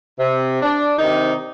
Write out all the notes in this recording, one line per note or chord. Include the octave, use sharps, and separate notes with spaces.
C3
D4
C3 D#3 D#4